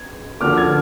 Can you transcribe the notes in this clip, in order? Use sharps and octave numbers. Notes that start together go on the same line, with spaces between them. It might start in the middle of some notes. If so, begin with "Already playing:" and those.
Already playing: G#6
D3 F3 A#3 D6 F6
F6 G#6